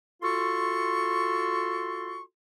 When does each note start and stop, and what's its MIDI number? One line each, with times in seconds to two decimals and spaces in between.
0.22 2.22 65
0.22 2.22 66
0.22 2.22 69
0.22 2.22 84
0.22 2.22 85